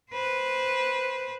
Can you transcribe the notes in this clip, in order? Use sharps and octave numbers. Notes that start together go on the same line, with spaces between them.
B4 C5